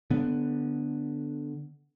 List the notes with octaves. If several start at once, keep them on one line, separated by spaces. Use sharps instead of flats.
D3 B3